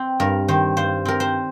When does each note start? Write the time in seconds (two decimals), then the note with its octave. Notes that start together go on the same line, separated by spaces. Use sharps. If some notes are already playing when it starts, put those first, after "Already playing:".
Already playing: C4
0.20 G2 A#4
0.48 D#3 C5
0.77 G2 C5
1.05 C4 A#4
1.20 C5